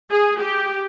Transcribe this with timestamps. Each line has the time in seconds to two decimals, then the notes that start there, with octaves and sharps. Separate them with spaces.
0.11 G#4
0.40 G4